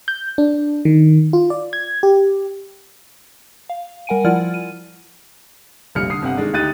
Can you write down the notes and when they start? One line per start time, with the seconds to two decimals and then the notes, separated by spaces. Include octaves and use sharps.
0.08 G6
0.38 D4
0.85 D#3
1.33 F4
1.50 D5
1.73 G#6
2.03 G4
3.70 F5
4.07 G3 A#4 F#5 G#5 D7 D#7
4.24 F3 E4 F4 D5 F#5 F6
4.54 D#7
5.95 F1 A#1 G3 F6 C#7
6.10 D3 D#6 C7
6.22 G1 C3 F#5
6.37 D#3 G#3 D4
6.53 D2 D#4 G4 F#6 A6 D#7